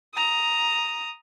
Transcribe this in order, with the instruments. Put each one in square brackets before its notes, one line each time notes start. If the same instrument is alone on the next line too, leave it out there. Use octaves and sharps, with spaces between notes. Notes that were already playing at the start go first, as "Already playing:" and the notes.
[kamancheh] A#5 D#6